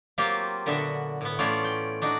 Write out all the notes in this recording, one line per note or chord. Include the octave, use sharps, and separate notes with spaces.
F#3 A#3 C4 F4 G4
A#2 D3 B3 F#4 E5
A2 B3
E3 A3 C#4 F4 C#5 D5
G5
D4 D#4 F#4 D5